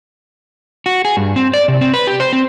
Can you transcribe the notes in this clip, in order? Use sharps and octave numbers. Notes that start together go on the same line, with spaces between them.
F#4
G#4
G2
C4
D5
C3
C4
B4
G4
C5
C4